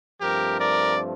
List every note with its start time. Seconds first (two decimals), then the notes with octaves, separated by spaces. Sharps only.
0.21 G2 F3 A3 C4 G4 A#4
0.60 A#4 D5